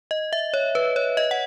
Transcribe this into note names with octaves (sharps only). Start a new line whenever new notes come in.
D#5
E5
C#5
B4
C#5
D#5
F#5